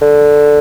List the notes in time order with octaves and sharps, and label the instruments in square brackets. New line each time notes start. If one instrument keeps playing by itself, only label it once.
[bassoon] D3